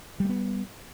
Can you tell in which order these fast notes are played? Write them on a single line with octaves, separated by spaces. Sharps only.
G3 A3 B3